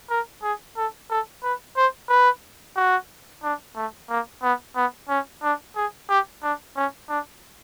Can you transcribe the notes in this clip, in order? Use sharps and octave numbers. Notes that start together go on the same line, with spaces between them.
A#4
G#4
A4
A4
B4
C5
B4
F#4
D4
A3
A#3
B3
B3
C#4
D4
G#4
G4
D4
C#4
D4